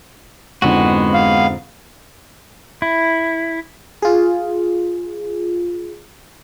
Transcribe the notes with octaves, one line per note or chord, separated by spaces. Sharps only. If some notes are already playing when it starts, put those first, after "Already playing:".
F2 G#2 D3 G#3 B3 F#4
F5
E4
F4 G#4